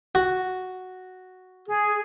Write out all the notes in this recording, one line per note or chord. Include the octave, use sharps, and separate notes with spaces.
F#4
G#4